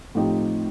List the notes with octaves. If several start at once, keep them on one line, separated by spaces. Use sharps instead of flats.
A2 F3 C4 D#4 G4